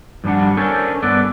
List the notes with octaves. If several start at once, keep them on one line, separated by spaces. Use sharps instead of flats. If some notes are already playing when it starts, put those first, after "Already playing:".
G2 F3 G3 D4 F#5
C#4 D4 A4 A#4 C5 C#5
G2 B3 A4 B4 D5